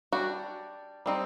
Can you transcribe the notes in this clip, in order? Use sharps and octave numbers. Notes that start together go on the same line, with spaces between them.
G3 D4 F#4
G3 C4 D#4